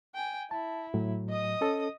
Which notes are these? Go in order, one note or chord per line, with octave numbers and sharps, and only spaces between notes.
G5 G#5
E4 A5
A2 F#3
D#5 D#6
C#4 A4